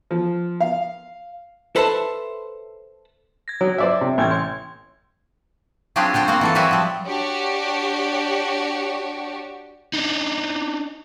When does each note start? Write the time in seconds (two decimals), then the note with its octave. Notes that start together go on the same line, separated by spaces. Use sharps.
0.11 F3
0.60 F5
1.76 A4 B4 C5 E5 F5 A5
3.48 G#6 A#6
3.61 F#3 C#5
3.78 C5 D5 E5
4.01 C3
4.18 A1 G5 G6 G#6
4.31 C6
5.96 F#3 C4 D4 F4 G4 G#4
6.14 D3 C4 F4 C5
6.28 A#3 C4 F4 F#4
6.41 E3 A4 A5
6.55 F#3 G3 C4 F#4 E5 G#5
6.71 F3 G3
7.06 D4 F#4 G4 C#5
9.93 D4 D#4